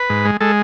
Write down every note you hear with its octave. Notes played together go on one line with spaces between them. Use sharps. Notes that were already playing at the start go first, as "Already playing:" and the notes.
Already playing: B4
G#2
G#3
G#3 A4